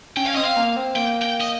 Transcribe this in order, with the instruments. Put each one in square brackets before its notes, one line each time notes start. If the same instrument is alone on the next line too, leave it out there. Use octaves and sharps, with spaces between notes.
[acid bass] C#4 [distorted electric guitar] G5
[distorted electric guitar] F5
[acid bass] C4 [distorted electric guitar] D#5
[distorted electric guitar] F5
[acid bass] A#3
C4
[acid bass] A#3 [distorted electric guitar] G5
[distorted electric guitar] G5
D#5